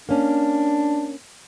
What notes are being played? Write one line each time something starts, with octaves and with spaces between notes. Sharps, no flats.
A#3 C#4 D4